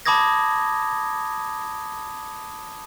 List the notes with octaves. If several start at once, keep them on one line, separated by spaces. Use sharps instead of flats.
A5 B5 D6 D#6 G#6 A#6